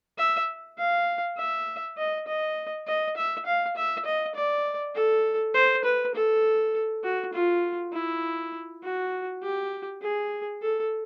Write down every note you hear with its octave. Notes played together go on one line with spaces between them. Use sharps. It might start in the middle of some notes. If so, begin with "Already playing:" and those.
E5
F5
E5
D#5
D#5
D#5
E5
F5
E5
D#5
D5
A4
C5
B4
A4
F#4
F4
E4
F#4
G4
G#4
A4